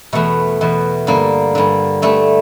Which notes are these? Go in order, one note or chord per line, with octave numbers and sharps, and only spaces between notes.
E2 B2 A3
E2 B2
G2 D3 A#3
G2 D3
G2 D3 A3